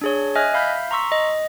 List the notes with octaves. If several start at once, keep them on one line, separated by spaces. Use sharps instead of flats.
D4 G#4 C#5
D#5 E5 G#5 F6 F#6 G#6
E5 F5 B5 F6 G6 B6
A#5 C6 C#6 E6 B6
D#5